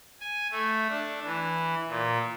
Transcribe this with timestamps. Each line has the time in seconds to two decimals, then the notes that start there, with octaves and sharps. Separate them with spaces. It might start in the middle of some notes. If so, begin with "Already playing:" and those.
0.21 G#5
0.51 A3
0.89 D4
1.24 E3
1.89 A#2